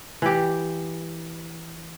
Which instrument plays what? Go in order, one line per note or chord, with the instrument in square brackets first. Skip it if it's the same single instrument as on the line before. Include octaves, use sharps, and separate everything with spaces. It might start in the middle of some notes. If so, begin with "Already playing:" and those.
[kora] E3 G4